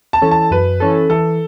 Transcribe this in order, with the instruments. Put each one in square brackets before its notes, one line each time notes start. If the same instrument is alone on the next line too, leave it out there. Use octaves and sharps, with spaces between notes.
[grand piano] A5
[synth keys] E3 C#4 A4
[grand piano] A5
[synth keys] F#2 [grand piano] B4
[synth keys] E3 C#4 A4
[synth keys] E3 [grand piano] A4